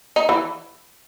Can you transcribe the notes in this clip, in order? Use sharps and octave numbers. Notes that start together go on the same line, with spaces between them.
D#4
E3